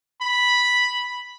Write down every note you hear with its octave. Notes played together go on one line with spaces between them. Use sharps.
B5